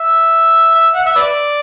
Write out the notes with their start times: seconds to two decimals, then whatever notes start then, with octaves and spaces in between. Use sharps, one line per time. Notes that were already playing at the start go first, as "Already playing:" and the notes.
Already playing: E5
0.75 E5
0.95 F#5
1.06 E5
1.16 B4 D5